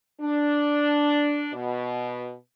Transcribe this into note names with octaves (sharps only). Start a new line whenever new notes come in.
D4
B2